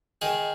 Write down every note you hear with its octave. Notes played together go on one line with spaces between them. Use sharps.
D#3 G#4